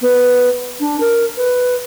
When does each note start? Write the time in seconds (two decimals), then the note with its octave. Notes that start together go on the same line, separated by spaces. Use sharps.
0.01 B3
0.80 D4
1.00 A#4
1.37 B4